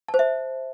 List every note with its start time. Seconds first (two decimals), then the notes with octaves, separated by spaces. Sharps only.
0.08 A5
0.14 C5
0.19 E5